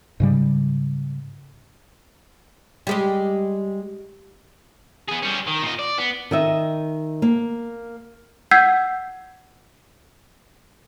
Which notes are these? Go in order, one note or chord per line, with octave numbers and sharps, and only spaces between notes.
G#2 C#3 G3
G3 G#3 G4
B3 G#4
G3 C#4
D#3
A#2 D#5
D5
B3
D#3 D#5 E5
A#3
F#5 E6 G6 G#6 B6 C7